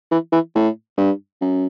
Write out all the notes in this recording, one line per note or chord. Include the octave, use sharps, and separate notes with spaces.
E3
E3
A2
G2
F#2